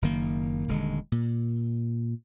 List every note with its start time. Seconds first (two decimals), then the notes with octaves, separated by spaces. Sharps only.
0.02 F#1 D#3 A#3
0.68 D#1 D3 G#3
1.12 A#2